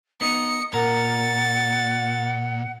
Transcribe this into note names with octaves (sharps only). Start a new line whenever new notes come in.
B3 D#4 D#6 C#7
A#2 A#4 F#5 A6